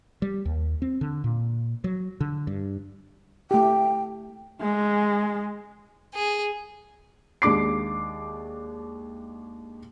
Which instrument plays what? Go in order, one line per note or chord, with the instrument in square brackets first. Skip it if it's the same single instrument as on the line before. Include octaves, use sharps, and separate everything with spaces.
[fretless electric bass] G3
D#2
C4
D3
A#2
F#3
D3
G2
[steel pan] A3 G4 [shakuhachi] G5
[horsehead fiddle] G#3
[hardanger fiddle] G#4
[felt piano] D#2 G#3 D4 D6 C7